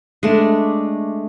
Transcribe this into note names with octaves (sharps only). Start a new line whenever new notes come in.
G#3 A3 D4